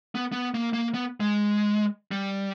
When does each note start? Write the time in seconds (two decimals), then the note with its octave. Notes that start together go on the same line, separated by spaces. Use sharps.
0.15 B3
0.32 B3
0.54 A#3
0.73 A#3
0.94 B3
1.20 G#3
2.11 G3